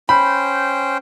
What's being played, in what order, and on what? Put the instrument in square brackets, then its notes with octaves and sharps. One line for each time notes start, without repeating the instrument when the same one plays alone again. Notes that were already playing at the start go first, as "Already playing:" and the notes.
[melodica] C#4 C5 G5 [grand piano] B5